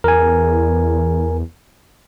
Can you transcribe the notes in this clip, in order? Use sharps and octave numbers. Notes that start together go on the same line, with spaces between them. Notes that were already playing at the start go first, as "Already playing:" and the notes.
E2 A#4 G#5